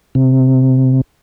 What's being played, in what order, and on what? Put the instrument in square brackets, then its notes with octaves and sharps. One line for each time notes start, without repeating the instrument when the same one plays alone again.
[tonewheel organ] C3